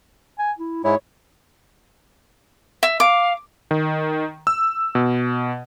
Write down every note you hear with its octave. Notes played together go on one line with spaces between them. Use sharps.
G#5
E4
G#2 G#3 E4 C#5
E5
F5 D6
D#3
E6
B2